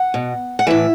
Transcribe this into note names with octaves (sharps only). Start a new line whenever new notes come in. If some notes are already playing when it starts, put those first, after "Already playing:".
Already playing: F#5
B2
F#5
A2 E3 E5